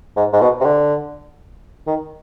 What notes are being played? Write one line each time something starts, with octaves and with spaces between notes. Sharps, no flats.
G#2
G#2
B2
C3
D3
D#3